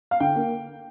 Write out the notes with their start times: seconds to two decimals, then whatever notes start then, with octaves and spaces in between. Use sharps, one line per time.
0.11 F5
0.20 D3 G5
0.36 A#3